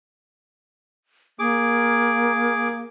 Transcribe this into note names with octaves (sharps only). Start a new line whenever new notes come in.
A#3 G#4 D6